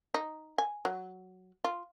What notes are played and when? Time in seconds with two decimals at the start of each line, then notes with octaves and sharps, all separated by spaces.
0.14 D#4
0.58 G#5
0.85 F#3
1.64 F4